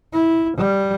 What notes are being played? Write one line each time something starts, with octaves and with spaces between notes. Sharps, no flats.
E4
G3